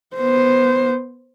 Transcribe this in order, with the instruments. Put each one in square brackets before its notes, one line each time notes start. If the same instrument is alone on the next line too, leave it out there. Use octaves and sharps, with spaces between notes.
[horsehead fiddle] B3 C5